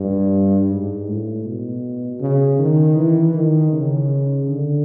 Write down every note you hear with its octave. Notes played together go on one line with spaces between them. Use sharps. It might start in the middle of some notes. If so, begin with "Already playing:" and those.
Already playing: G2
G#2
A2
B2
C#3
D#3
E3
D#3
C#3
D3